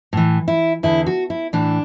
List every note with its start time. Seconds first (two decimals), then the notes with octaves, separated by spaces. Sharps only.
0.13 A2 E3
0.48 E4
0.83 E2 D3 E4
1.06 F#4
1.30 E4
1.53 A2 E3 D4